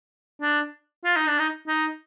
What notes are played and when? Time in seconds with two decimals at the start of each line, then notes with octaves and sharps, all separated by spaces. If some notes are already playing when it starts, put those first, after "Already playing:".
0.42 D4
1.05 F4
1.16 D#4
1.28 D4
1.39 D#4
1.67 D#4